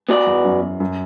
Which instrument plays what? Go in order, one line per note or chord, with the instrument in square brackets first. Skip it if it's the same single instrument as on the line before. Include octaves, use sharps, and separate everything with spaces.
[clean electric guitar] B3 F#4 B4 D5
[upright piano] E2
F#2
F#2